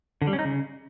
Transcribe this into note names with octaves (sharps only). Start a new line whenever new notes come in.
D3
G3
C#4
D#4
C#3